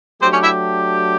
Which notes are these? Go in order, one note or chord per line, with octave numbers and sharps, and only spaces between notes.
F#3 A3 C4 D4 G4 C5
C#4 C#5
E4 E5